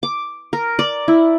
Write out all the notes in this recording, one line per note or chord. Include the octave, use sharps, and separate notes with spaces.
D6
A#4
D5
E4